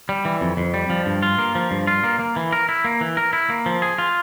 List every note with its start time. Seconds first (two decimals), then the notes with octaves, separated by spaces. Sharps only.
0.09 G3
0.25 E3
0.41 F2
0.57 F2
0.74 G3
0.90 F3
1.06 G2
1.22 F4
1.39 A#3
1.55 F3
1.71 G2
1.87 F4
2.04 A#3
2.19 A#3
2.36 E3
2.53 A#4
2.69 E4
2.85 A#3
3.01 E3
3.17 A#4
3.33 E4
3.50 A#3
3.66 F3
3.82 G#4
3.98 F4